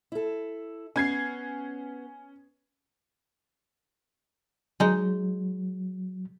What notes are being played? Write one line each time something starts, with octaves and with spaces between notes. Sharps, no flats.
E4 A4
B3 C#4 G#6 C7
F#3 G#3 D#4